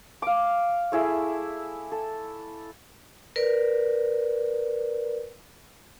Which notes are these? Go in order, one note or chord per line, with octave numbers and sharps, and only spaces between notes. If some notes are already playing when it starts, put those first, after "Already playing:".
F5 D6
A3 E4 G#4 E5
A4
A#4 B4 D5